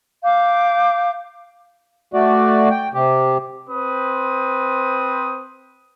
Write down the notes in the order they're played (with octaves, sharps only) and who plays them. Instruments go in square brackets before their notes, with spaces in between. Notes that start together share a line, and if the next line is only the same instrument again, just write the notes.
[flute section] F5 D6 G6
[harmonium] A3 F#4 D5
G5
C3 G4
[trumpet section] C4 B4 C5 D#6